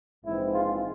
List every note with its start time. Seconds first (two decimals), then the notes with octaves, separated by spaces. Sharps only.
0.24 A#1 G#2 E3 G#3 C4 E4
0.53 F4